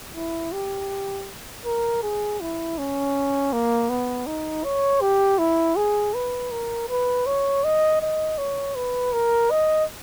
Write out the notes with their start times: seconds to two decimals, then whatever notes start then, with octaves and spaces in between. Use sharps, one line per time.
0.15 E4
0.53 G4
1.66 A#4
2.03 G#4
2.41 E4
2.78 C#4
3.53 A#3
3.90 B3
4.27 D#4
4.64 C#5
5.01 G4
5.39 E4
5.76 G#4
6.14 B4
6.51 A#4
6.89 B4
7.26 C#5
7.64 D#5
8.02 D#5
8.38 C#5
8.76 B4
9.13 A#4
9.51 D#5